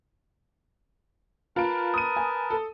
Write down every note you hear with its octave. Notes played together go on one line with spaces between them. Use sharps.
F4 A#4 B4 A5 D7
D#6 D#7
G#5
A4